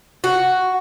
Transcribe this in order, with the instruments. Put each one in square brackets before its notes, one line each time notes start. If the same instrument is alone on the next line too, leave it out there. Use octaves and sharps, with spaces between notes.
[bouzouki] F#4